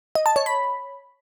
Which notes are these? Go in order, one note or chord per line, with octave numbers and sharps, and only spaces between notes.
D#5
A5
C#5
B5